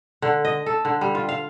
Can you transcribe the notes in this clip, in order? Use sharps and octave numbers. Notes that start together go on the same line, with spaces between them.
D3
D#5
A4
D3
G3
F4
F5